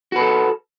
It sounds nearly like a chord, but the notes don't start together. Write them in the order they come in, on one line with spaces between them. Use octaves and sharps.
F#4 B4 A4